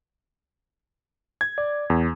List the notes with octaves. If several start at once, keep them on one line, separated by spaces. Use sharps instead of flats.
G#6
D5
E2